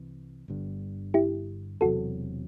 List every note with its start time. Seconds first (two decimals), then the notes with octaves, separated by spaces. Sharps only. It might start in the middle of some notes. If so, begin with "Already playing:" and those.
Already playing: C2 C3 E3
0.48 G1 G2 D3
1.14 E4 G4
1.81 E1 E2 C3 F#3 F#4 A4